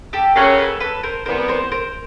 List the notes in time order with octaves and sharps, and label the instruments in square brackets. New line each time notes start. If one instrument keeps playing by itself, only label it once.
[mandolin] G4 A4
[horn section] C#3 F#3 A#3 C#4 [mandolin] G4 A4
[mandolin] A4 B4
A4 B4
A#4 C5
[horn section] C3 E3 G3 B3 [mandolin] A#4 C5
[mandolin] A#4 C5
A#4 C5